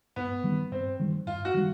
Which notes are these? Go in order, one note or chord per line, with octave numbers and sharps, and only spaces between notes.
G2 B3
D#3 G3
G2 C4
D#3 G3
G2 F4
F#4
D#3 G3